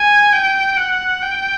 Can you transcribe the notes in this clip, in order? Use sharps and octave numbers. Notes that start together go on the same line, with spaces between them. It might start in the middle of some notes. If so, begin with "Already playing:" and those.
Already playing: G#5
G5
F#5
G5